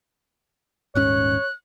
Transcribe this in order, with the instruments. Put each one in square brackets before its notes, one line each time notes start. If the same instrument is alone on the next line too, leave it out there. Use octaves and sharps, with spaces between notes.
[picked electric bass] D#1 G#2 C#4 [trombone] C#5 [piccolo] F#6